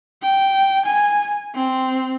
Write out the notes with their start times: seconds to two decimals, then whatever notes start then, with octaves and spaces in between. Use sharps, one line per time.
0.22 G5
0.85 G#5
1.55 C4